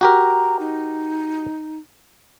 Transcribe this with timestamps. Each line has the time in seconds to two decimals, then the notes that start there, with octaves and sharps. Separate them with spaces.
0.01 F#4 G4 A#4 A#5
0.59 D#4